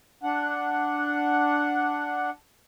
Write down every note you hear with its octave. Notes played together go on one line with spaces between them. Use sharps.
D4 F#5